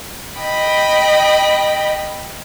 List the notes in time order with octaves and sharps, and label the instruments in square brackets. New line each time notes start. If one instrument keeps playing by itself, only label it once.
[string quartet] D#5 G5 B5